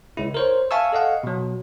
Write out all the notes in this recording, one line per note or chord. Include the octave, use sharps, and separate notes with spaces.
C#2 E4
A#4 C5 C#5
E5 F5 G#5 A5 C#6 E6
A4 D#5 F5 F#5
B2 F#3